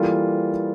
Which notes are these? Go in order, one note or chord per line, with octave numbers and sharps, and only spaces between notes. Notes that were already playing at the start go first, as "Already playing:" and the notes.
Already playing: E3 G3 A#3 F4 A4